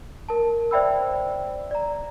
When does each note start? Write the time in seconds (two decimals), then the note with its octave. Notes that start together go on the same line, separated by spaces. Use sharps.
0.29 A#4 A5
0.71 C5 D5 E5 G5 B5 E6
1.71 D5 A#5